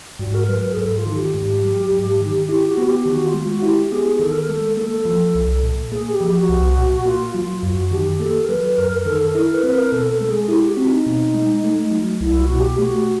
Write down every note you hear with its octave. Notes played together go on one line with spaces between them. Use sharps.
G#2 F#4
A#4
F#3 B4
A#4
G#4
G#2 A4
F4
D#3
G4
G#2
F#3
G#2
D#3
E4 G4
F#4
B3
G4
D#3 F#4
F4
G#3
F#4
E4 G4
B3 G#4
D#3 A4
A#4
A4
G#3
A#3 A4
F3
C2
A#2
A#3 G#4
G4
F3
F#4
C2
A#2
A#3 F4
F#3 F4
F#2 F#4
D#3 G4
A#3 A4
A#4
F#3 B4
F#2 A#4
A#4
D#3 A4
A4
E4 A#4
B4
C4
A#4
B2 A4
A4
G#3
G#4
E4 G4
F#4
C4
D#4
B2
G#3
A3
F#3
C2 E4
F#4
B2
G4
A3 F#4